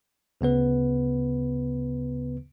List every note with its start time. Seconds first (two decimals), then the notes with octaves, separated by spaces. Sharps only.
0.41 D2 C#3 B3 B4